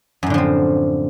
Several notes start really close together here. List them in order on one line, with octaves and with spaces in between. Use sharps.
F#2 A2 D3 F3 C4